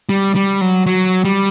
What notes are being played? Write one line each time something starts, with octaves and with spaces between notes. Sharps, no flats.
G3
G3
F#3
F#3
G3